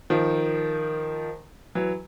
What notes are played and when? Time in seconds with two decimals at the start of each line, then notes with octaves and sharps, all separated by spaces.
0.10 D#3 F3
1.75 E3 F#3